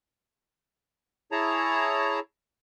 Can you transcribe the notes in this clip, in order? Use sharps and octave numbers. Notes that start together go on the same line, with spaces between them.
E4 G#4 C#5 A5 A#5